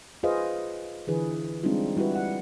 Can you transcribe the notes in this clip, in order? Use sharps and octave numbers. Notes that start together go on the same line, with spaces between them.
F4 G#4 B4 C5 D#5 F5
D3 E3 G#4 B4
G3 G#3 C4 D4 D#4 F4
G3 E4 F#4 G4 B4
F#5